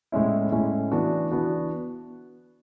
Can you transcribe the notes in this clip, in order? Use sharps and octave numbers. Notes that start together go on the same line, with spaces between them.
A2 G#3 C#4 E4
A2 G#3 C#4 E4
E3 B3 D4 F#4
E3 B3 D4 F#4